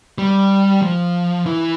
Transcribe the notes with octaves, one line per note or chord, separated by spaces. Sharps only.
G3
F3
E3